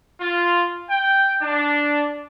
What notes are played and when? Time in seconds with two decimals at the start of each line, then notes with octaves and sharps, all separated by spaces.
0.20 F4
0.89 G5
1.41 D4